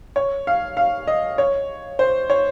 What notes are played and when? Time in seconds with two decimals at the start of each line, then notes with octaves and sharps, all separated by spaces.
0.16 C#5
0.47 F5
0.77 F5
1.07 D#5
1.38 C#5
1.99 C5
2.30 C#5